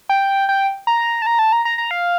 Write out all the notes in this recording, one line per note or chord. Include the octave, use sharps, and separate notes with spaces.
G5
G5
A#5
A5
A#5
A5
A#5
A#5
A#5
F5